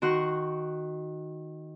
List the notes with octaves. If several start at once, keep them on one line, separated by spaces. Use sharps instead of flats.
D#3 F#4 C6 C#6 F#6